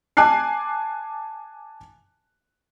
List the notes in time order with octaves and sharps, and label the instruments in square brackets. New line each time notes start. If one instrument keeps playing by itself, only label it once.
[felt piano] G#5 A5 D6 F#6 C7